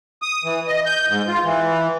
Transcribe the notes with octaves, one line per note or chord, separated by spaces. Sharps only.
D#6
E3
D#5
G6
G#2
F4
E3